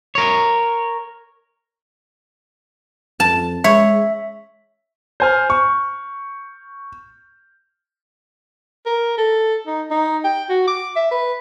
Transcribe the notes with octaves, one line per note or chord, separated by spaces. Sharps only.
A#4 C#5
F2 A5
G#3 C#5 E5
C5 G#5 F6
C#6
A#4
A4
D#4
D#4
G5
F#4
D6
E5
B4